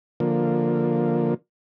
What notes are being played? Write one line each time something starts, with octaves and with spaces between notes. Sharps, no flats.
D3 F3 A#3